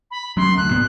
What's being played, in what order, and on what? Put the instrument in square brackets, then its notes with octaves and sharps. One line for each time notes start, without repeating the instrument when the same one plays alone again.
[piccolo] B5
[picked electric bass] F#3 C#4 [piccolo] C6
[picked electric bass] D2 [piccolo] F#6
[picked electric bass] A2 A#3 B3